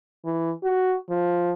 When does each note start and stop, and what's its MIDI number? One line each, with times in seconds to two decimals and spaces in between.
0.25 0.51 52
0.63 0.95 66
1.10 1.52 53